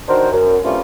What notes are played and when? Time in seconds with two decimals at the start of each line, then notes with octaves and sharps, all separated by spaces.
0.08 D#3 D4 F#4 A#4 C5
0.31 F#2
0.64 G2 C3 G3 A3 C#4 F4